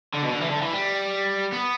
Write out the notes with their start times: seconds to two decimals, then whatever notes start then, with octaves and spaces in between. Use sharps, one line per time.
0.14 D3
0.23 B2
0.32 D3
0.41 E3
0.50 D3
0.61 E3
0.73 G3
1.52 B3